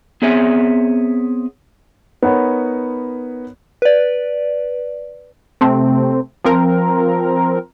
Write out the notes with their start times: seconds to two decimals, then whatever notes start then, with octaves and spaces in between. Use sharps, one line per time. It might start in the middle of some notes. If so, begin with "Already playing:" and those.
0.22 B3 C4 G#4 C#5 E5 G#5
2.22 B3 D#4 A#4 C#5 F#5 B5
3.82 B4 D5
5.61 C3 A3 C4
6.44 F3 C4 A#4